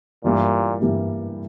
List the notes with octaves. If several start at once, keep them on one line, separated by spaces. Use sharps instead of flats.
G2 A#2 E3 G3 A#3 E4
G2 E3 G3 A#3 E4